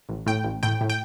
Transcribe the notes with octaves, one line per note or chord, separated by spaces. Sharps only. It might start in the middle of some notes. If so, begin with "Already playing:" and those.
A1
A2 G5
A1
A2 G5
A2
G5